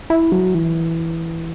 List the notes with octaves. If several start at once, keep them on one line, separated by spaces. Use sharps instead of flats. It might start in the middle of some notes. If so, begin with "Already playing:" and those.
E4
F#3
E3